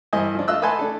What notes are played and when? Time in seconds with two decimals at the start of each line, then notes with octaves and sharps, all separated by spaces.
0.13 G2 E3 C5 D#5 G#5
0.35 F3 D4
0.48 F4 D#5 E6 F#6
0.62 B4 D#5 F#5 G#5 A5 C6
0.79 A3 D4 A4